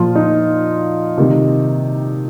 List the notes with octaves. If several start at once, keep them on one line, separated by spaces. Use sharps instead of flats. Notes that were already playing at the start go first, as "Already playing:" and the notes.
Already playing: A#2 F3 F4
D#4
C3 D#3 G3